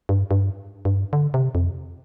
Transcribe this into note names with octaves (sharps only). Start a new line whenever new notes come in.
G2
G2
G2
D3
C3
F2